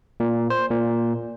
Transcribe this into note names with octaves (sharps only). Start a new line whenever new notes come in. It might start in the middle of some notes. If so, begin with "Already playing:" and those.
A#2
C5
A#2